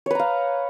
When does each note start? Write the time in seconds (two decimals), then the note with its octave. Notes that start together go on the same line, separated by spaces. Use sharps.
0.06 C#5
0.11 B4
0.15 A#5
0.19 F5